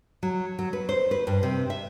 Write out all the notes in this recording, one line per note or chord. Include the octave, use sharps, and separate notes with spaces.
F#3
F#3
B4
C5
B4
G2
C3
E5